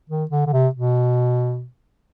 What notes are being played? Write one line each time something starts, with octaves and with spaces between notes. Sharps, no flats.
D#3
D3
D3
C3
B2